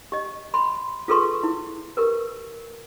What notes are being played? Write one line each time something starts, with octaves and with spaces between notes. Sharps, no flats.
G4 D#5
B5 C6
F4 G#4 A4 B4 C6 C#6
E4
G4 A#4 B4